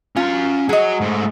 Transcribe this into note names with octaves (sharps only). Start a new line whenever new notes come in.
C#4 F4 A#5
F#3 G#4 D#5 F#5
G#2 A3